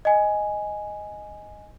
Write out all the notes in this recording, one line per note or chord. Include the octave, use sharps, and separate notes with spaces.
D#5 G#5